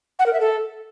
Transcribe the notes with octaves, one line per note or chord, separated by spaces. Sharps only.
F#5
A#4
E5
A4